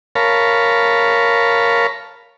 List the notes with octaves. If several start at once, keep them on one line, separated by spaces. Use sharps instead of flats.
A#4 C#5 F5 A5 B5